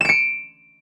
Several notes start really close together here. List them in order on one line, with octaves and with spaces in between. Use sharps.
E7 D7 C#7